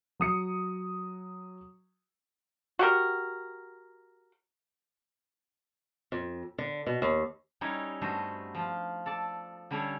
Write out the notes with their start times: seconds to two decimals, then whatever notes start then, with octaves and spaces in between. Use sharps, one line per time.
0.20 F#3 D#6 C#7
2.79 F#4 G4 A#4
6.12 F2
6.58 D3
6.87 B2
7.02 D#2
7.61 G3 C#4 D#4 E4 C#5
8.01 G2 A3 B3 F#4 C5
8.55 F3 F4
9.06 A4 D5 A5
9.71 D3 G3 C#4 D4 A4 C#5